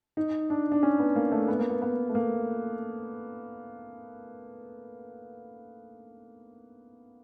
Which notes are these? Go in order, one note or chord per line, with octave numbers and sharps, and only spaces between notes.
D#4
D4
D4
C#4
B3
A#3
A3
B3
A#3
B3
B3
A3
A#3